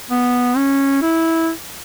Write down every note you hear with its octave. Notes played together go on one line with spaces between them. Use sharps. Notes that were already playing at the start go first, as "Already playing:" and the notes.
B3
C#4
E4